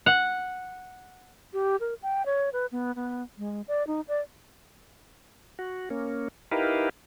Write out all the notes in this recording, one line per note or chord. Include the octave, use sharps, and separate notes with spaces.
F#5
G4
A#4
G5
C#5
B4
B3
B3
G#3
D5
D#4
D5
F#4
A#3 C#4
D#4 E4 G4 A#4 B4 F5